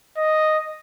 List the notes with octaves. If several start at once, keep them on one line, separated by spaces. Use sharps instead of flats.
D#5